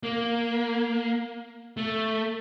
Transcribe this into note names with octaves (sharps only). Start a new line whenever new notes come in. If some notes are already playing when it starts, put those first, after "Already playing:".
A#3
A3